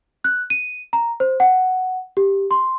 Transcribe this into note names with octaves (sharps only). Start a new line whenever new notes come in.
F#6
D#7
A#5
C5
F#5
G4
C6